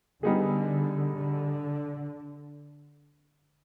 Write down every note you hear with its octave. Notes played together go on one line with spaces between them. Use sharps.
D3 G3 B3 D#4 G#4
D3